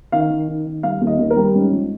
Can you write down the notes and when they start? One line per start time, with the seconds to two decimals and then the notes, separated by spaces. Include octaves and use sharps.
0.12 D#3 F5
0.30 D#3
0.48 D#3
0.66 D#3
0.83 G3 F5
1.01 D#2
1.07 D#5
1.19 D#2
1.30 A#4
1.37 G3
1.54 G#2 C#4
1.72 F3